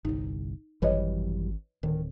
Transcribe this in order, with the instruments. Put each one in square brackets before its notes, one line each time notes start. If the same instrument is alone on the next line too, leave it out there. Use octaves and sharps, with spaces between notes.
[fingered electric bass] G1 C2 [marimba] D#4
[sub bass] G#1 [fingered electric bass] F#2 E3 G3 [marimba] B4 C#5 D#5
[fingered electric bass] D1 [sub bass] D#3